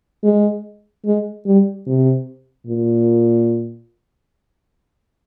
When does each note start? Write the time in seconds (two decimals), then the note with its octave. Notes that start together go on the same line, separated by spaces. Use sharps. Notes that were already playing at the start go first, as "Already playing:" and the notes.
0.24 G#3
1.06 G#3
1.46 G3
1.87 C3
2.67 A#2